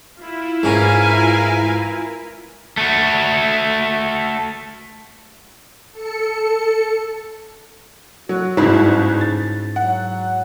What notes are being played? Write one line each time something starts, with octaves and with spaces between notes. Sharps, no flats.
E4 F4
G#2 C#4 A#4 B4 F5 G#5
A3 F#4
A4 C#7
F#3 F#4
G1 G#2 C#3 E4
A6
F#3 F#5